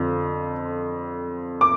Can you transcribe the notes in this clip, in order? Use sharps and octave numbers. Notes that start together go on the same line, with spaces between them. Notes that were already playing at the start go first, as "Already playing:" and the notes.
Already playing: F2 D3 F3 C4
D6